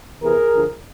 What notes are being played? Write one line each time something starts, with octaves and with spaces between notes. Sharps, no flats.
E2 C3 E3 G#4 A#4
D2 D3 F3